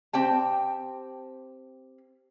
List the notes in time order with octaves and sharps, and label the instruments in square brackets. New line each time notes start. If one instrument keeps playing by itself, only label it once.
[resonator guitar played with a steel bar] C4 G4 G5 A5